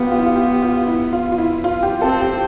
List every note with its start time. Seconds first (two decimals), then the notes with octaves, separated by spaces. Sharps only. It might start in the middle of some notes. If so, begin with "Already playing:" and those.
Already playing: B3 F4 G4
0.11 F4
0.19 E4
0.26 F4
0.36 G4
0.62 F4
0.87 E4
1.13 F4
1.32 F4
1.38 E4
1.64 F4
1.83 G4
2.01 C4 A4
2.21 G4